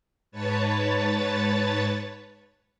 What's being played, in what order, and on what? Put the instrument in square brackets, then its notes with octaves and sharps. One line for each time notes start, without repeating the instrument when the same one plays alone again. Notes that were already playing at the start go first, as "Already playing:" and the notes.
[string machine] G#2 B4 C#5 A5 A6